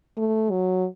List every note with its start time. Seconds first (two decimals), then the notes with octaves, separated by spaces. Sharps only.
0.17 A3
0.51 F#3